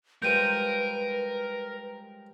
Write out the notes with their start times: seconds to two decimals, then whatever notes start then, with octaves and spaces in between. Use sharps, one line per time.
0.22 F3 G3 G#3 A#4 B4 G6 D#7